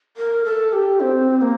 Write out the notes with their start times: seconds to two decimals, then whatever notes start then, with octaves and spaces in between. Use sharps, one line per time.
0.17 A#4
0.44 A4
0.73 G4
1.00 C4
1.41 A#3